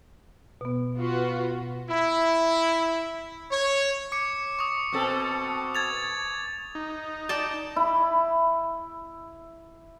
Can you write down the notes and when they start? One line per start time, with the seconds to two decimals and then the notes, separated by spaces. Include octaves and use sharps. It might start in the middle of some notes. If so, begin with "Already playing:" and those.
0.61 B2 B3
0.98 F4 F#4 B4
1.90 E4
3.51 C#5
4.12 D6 C#7
4.59 C#6 D#6
4.92 B2 C4 A4
5.75 G#6 A6 F7
6.75 D#4
7.29 D5 G5 A5
7.76 E4 B5